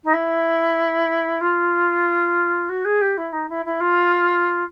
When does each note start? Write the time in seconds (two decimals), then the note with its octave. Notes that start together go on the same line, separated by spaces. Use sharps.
0.04 D#4
0.13 E4
1.40 F4
2.69 F#4
2.84 G#4
3.01 G4
3.17 E4
3.32 D#4
3.49 E4
3.65 E4
3.80 F4